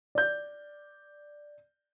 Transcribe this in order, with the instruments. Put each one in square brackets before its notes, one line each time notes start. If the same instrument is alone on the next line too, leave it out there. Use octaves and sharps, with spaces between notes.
[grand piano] D5 G6